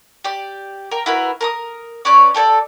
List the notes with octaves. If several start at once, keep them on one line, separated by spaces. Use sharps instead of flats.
G4 D5
A#4 G5
E4 F#4 A#4 B4
A#4 A#5 D#6
C#4 B4 C#5 D5
G4 A4 C#5 D5